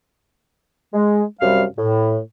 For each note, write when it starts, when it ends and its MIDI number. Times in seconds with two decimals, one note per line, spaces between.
0.93 1.22 56
1.40 1.63 42
1.40 1.63 48
1.40 1.63 55
1.40 1.63 77
1.77 2.18 45